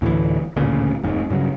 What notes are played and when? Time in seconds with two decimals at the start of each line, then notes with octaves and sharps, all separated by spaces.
0.02 D2 A2 D3 E3
0.56 A1 D2 A#2 C#3
1.03 F1 D#2 G#2
1.30 G2 C#3 F#3